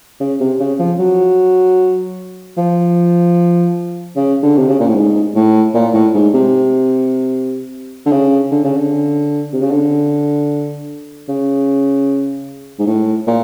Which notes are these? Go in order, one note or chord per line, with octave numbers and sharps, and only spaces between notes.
C#3
C3
C#3
F3
F#3
F3
C#3
D3
C3
C#3
A#2
A2
G#2
A2
A#2
A2
G#2
C3
D3
C#3
D3
C#3
D3
C3
C#3
D3
C#3
G#2
A2
A#2